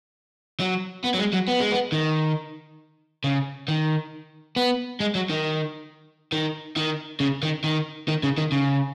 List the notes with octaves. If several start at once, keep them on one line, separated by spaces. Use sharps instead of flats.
F#3
B3
F#3
G#3
F#3
B3
G#3
B3
D#3
C#3
D#3
B3
G#3
F#3
D#3
D#3
D#3
C#3
D#3
D#3
D#3
C#3
D#3
C#3